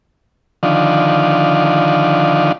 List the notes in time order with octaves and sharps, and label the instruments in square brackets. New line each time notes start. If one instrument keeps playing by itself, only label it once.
[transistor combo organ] D3 D#3 F3